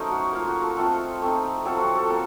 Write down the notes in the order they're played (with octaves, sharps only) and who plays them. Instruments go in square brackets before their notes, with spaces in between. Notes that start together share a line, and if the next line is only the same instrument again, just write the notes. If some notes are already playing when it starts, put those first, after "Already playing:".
Already playing: [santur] F#3 A3 C#4 D#4 A#4 C5 D#5
F#4
A#3 F4
F#4
A4
A3 C4 F4 A4
A3 C4 D#4
F#3 C4 F4 A4
F#4
A4
A#3 A4